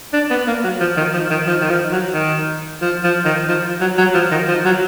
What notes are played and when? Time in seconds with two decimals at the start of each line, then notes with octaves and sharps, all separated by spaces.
0.13 D4
0.30 B3
0.47 A#3
0.64 F#3
0.80 F3
0.97 D#3
1.13 F3
1.30 D#3
1.47 F3
1.61 D#3
1.70 F3
1.92 F#3
2.14 D#3
2.82 F3
3.04 F3
3.25 D#3
3.48 F3
3.81 F#3
3.98 F#3
4.14 F3
4.31 D#3
4.48 F3
4.65 F#3